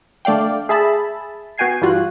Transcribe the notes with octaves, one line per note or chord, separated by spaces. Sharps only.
D3 A3 D5 F5 G5
G#4 E5 A5 B5
B3 F#4 G5 G#5 G#6 C7
G2 E3 G3 F4 F#4 F#6